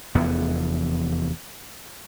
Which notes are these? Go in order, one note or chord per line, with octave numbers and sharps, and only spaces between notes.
F1 E2 B3